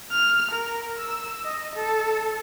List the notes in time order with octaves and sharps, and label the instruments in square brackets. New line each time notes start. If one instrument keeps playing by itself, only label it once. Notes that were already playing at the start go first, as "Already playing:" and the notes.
[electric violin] F6
A#4
E6
D#5
A4